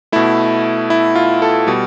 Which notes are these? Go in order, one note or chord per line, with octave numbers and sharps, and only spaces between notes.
B2 A3 E4
E4
F4
A4
B2 G3